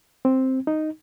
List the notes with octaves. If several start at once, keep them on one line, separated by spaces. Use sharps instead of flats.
C4
D#4